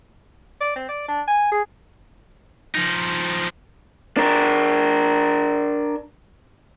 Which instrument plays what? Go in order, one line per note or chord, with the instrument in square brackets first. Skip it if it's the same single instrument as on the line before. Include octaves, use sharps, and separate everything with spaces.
[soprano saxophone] D5
C4
D5
D4
G#5
G#4
[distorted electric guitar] F3 D#4
[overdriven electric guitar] D4 A#4